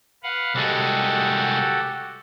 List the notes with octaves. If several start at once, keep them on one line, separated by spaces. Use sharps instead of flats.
B4 F5 F#5
C2 G#3 F#4 G4 A4